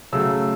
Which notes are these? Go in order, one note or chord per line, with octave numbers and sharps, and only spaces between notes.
C#3 F#3 A3 E6